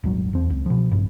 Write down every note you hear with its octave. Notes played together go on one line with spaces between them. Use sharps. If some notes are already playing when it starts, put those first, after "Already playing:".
D#1 G#1 F#3
E2 C4
C#2
B2 F3
A#1 G2